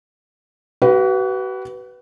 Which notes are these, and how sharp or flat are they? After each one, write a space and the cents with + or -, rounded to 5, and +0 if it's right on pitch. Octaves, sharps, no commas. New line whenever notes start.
F#4 +40 B4 +0 F5 +0